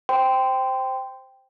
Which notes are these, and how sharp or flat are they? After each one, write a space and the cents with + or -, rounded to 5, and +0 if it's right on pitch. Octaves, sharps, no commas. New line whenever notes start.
C5 +5 G5 +0 C6 -20